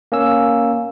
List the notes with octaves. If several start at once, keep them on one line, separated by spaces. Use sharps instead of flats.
A#3 C#4 E6